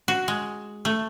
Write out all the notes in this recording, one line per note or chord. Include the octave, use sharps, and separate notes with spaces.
F#4
G#3
A3